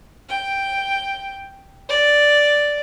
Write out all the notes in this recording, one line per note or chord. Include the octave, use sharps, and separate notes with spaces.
G5
D5